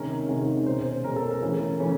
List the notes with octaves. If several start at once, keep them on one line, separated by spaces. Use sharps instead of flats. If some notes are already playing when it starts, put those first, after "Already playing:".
Already playing: C3 D#3 G#3 C#4 A#4
C3 D#3 G#3 C#4
B2 G#3 C#4 C5
B2 G#3 C#4 A#4
A4
A#4
C#3 E3 A3 C#4
C#3 E3 A3 C#4